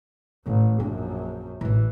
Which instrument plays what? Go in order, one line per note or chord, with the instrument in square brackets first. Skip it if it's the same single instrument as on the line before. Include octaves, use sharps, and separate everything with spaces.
[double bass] A1 [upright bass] A2
[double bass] A#1 F#2 [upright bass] D4
[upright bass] A1 A2 [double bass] E3